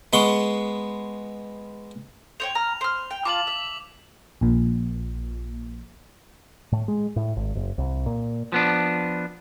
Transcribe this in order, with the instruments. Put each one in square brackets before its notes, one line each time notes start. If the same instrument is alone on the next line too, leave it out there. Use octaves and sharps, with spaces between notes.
[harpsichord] G#3 B3 C6 C#6
[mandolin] C5 C#5 G5 [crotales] F7
[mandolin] A#5 F6
C5 F6
G5
[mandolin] F4 A5 [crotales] D6 F#7
[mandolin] E5
[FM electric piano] A#1 A#2
[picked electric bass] A2
G#3
A2
G#1
F#1
C2
A#2
[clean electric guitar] F3 B3 D4